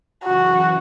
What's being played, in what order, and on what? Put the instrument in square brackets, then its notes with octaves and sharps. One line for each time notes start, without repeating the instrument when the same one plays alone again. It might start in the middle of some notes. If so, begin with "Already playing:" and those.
[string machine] F#2 C#3 E3 [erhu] F#4